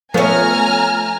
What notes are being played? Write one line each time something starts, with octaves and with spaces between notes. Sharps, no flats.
F3 A3 B3 C#4 G#5 A#5 F6